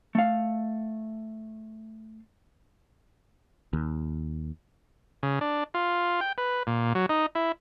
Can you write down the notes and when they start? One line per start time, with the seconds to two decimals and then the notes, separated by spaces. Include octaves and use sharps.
0.15 A3 F5
3.73 D#2
5.23 C#3
5.41 D4
5.74 F4
6.21 G5
6.38 B4
6.67 A#2
6.95 F#3
7.09 D#4
7.35 E4